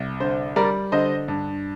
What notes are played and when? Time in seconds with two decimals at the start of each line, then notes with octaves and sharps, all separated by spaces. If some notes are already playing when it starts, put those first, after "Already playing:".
Already playing: C2
0.20 D3 C5
0.56 G3 A#4 D5
0.92 D3 C5 D#5
1.28 G2